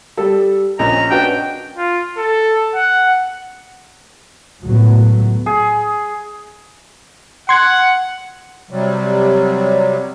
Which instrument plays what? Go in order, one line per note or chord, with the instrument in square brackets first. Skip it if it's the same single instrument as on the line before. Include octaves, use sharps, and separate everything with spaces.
[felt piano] G3 [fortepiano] A4
[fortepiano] A#1 [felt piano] C#4 D#5 [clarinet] A#5
[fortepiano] D4 F#4 B4 [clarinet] G5
[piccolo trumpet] F4
A4
F#5
[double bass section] C#2 A2 F#3 A3 B3
[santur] G#4
[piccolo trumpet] F#5 [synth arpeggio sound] C6 G#6
[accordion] C3 F#3 G3